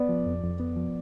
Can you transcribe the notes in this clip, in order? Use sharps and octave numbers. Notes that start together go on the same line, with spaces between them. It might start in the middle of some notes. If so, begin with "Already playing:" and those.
Already playing: B3 D5
F3
F2
F2
B3
F3